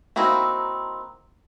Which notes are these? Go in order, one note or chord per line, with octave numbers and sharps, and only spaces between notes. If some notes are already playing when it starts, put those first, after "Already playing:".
A#3 C4 D#4 E4 F#4